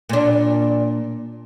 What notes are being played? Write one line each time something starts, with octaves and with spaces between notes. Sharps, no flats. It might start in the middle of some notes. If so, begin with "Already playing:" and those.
A#2 D4